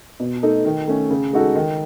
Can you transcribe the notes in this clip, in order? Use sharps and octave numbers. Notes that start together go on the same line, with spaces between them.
B2
A3 D#4 A4
D#3
A3 C#4
C#3
G#3 D#4 F#4 A4
D#3